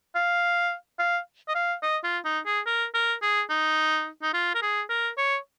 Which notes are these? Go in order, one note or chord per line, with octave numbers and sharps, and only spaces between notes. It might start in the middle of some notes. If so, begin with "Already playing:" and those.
F5
F5
D#5
F5
D#5
F4
D#4
G#4
A#4
A#4
G#4
D#4
D#4
F4
A#4
G#4
A#4
C#5